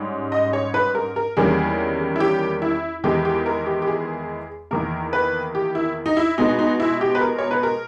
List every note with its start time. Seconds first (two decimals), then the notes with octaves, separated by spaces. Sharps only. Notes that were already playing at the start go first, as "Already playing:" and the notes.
Already playing: G#2 G3 C#4
0.32 D#5
0.53 C#5
0.74 B4
0.95 A#4
1.16 A#4
1.37 E2 D#3 G3 A#3 C#4 G#4
2.16 E4
2.20 G4
2.62 E4
3.04 E2 D#3 G#3 B3 G4
3.25 G4
3.46 A#4
3.66 G4
3.82 G4
3.87 G#4
4.71 E2 D#3 A#3 A#4
5.13 B4
5.55 G4
5.75 E4
6.06 D#4
6.17 E4
6.38 B2 G#3 B3 D#4
6.59 D#4
6.80 E4
7.01 G4
7.15 B4
7.21 A#4
7.38 C#5
7.51 B4
7.63 A#4